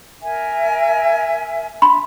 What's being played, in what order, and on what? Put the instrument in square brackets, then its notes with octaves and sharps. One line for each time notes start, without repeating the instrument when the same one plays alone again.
[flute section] A#4 E5 G#5
[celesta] B5 C6